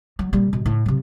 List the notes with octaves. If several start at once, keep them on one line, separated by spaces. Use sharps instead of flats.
F#3
A#2 G3
B2
A2
C3 F#3